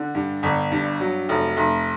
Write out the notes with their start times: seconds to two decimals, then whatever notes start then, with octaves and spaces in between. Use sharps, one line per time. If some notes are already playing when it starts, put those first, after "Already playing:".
Already playing: D3
0.15 G2
0.43 G1
0.71 G2
1.00 F#3
1.29 F1
1.57 F1